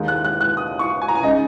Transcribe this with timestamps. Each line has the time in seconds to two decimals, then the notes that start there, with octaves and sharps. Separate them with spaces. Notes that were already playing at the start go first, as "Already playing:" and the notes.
Already playing: D#2 D#3 G#3 D#4
0.08 F#6
0.25 F#6
0.41 F#6
0.57 D#6
0.79 C#6
1.02 G#5
1.08 A#5
1.15 G#5
1.23 C#3 G#3 D#4 D#5